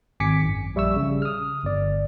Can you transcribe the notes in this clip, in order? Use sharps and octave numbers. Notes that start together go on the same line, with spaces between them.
G#1 G#5 D6 B6 C#7
F#2
A#1 G3 E5 C#6 E6
C#3
D#6 F6
G1 D5